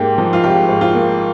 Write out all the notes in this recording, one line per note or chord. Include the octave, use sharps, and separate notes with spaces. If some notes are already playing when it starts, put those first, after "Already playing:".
Already playing: G#2 A#3 G4
F3
F4
G#1 G4
G#2
F4
A#3